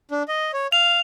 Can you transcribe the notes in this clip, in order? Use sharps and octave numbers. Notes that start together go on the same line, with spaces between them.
D4
D#5
C#5
F5 F7